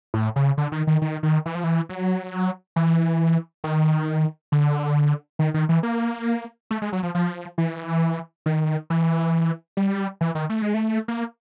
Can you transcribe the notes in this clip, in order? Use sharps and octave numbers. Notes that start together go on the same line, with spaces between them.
A2
C#3
D3
D#3
D#3
D#3
D#3
E3
F3
E3
F#3
E3
D#3
D3
D#3
D#3
E3
A#3
A3
G#3
F#3
F3
F3
E3
D#3
E3
G3
E3
D#3
A3
G#3
A3
A#3